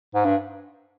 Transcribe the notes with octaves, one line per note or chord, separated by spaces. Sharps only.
G#2
G2